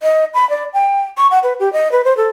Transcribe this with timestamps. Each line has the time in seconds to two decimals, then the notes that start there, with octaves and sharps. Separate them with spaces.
0.03 D#5
0.34 B5
0.50 D5
0.74 G5
1.17 C#6
1.31 F#5
1.43 B4
1.60 G4
1.73 D#5
1.92 B4
2.05 C5
2.17 A4